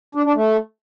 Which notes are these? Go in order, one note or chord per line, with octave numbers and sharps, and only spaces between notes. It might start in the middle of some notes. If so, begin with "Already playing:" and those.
D4
D4
A3